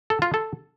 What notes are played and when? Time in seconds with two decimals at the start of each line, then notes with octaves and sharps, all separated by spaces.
0.10 A4
0.22 F4
0.34 A4